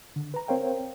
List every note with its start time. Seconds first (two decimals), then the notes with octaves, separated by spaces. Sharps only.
0.16 D3
0.34 B4 A#5
0.48 C4 A#4 C5 C#5 F5 G5